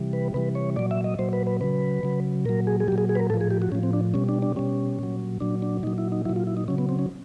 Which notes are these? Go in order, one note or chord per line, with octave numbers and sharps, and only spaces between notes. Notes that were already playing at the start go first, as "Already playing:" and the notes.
Already playing: C3 E3 G3
B4
C3 E3 G3 B4
C#5
A#2 F#3 D5
E5
D#5
A#2 F#3 C5
B4
B4
C#3 F#3 B4
C#3 F#3
A#2 F#3 A#4
G#4
G#4
A#2 F#3 G4
G#4
G#4
B4
A#4
A2 F3 A4
G#4
G4
F#4
A2 F3 C#4
C4
D4
B2 G3 C#4
D4
D4
B2 G3 C#4
A#2 F#3
A#2 F#3 D4
D4
A#2 F#3 D#4
E4
D#4
A#2 F#3 E4
F4
E4
D#4
C#3 F#3 C#4
B3
C4
C#4